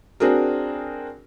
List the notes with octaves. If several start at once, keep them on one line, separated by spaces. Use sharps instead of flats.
C4 D4 F#4 G#4 A#4